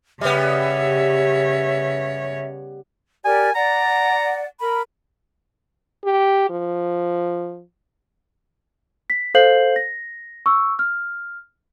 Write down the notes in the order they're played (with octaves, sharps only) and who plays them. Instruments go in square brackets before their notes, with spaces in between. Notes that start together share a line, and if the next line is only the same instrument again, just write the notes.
[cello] C#3 C#5 [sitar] G3 B3 [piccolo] E5
[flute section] G4 A#4 D5 [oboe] G#5
[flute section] D5 F#5 [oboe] A#5
[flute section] A#4 B5
[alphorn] G4
F3
[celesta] B6
A4 C5 F5 G6 C7 F#7
A#6
C#6 E6
F6